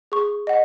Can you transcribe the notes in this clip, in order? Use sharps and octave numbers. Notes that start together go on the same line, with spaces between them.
G#4 C#6
D#5 F#5